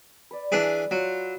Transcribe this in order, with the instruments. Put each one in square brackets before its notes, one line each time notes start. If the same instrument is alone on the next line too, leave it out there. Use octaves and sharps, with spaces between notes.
[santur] B4 D5
[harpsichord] E3 D4 G#4
[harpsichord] F#3 [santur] F4